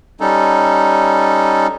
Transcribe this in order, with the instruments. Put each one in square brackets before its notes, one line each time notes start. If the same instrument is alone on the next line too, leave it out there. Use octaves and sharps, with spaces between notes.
[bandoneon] G3 C#4 D#4 A4